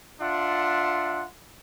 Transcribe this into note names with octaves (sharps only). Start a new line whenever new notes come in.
D4 F4 E5 F#5 C6